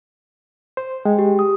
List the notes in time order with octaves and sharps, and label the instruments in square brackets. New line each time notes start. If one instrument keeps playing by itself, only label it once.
[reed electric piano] C5
[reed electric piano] G#3 [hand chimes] G5
[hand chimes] G4
D#6